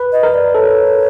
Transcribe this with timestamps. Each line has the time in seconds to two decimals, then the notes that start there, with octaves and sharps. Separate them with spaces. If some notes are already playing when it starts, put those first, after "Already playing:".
Already playing: B4
0.13 D#5
0.23 A#4
0.34 D5
0.55 A4 C#5